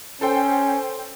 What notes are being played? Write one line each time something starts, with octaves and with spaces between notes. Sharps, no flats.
C#4 A4 C5 G5